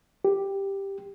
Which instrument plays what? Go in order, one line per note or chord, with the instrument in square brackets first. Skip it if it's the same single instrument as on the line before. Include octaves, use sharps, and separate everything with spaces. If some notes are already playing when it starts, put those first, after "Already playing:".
[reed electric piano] G4